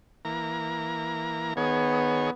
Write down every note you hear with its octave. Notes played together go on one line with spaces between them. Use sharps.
E3 A#3 A#5
D#3 B3 G#4 C#5